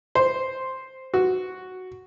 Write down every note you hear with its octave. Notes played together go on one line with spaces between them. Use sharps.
C5
F#4